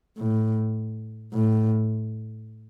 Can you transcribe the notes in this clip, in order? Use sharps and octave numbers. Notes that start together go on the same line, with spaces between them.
A2
A2